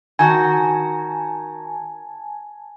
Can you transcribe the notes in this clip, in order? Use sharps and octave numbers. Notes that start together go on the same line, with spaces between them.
D#3 F#4 G#5 A5